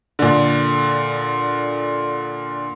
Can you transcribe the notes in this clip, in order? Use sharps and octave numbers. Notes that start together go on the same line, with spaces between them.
A#2 D3